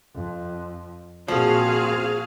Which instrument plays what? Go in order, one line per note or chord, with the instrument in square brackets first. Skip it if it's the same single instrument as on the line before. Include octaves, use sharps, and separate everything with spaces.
[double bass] F2
[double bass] A#2 C4 [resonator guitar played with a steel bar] F3 [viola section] F#4 G#4 F5